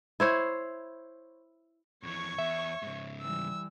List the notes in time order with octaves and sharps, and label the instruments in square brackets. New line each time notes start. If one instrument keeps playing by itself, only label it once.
[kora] E4 C5 C#5
[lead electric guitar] F2 E3 [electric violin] C#5 C#6
[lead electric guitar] E2 [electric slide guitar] E5
[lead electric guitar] G#2 C#3
[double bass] E3 G3 [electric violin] E6